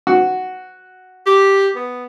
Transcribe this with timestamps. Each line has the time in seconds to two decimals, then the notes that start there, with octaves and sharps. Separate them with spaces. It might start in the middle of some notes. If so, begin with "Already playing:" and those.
0.07 F#4
1.27 G4
1.76 B3